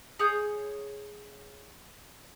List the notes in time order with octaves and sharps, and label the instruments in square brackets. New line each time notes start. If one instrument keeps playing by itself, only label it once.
[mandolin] G#4 C#5 D#6 G6